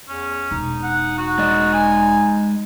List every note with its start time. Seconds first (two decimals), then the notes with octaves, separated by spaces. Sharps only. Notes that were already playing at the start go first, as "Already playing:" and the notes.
0.09 E2 C#4
0.51 E1 D#4
0.83 F#5
1.18 F#4
1.38 G#3 D5 D#5
1.73 G#5